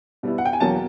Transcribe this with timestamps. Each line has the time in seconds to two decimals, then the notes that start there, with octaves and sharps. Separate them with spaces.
0.23 B2 G3 B3 E4
0.38 F#5
0.46 G5
0.53 G#5
0.60 E2 B2 F#3 A#3 A5